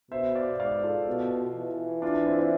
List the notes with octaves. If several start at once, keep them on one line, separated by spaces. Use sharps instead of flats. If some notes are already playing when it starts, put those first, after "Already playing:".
B2 C5 E5
D5 F5
G#2 D5 F5
F4 A4
B2
E3
D4 F4
D4
C4 E4
C4